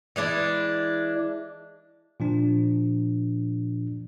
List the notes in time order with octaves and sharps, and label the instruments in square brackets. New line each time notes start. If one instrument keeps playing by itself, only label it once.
[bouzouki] E3 G#3 D4 E4
[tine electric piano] A#2 F3 D4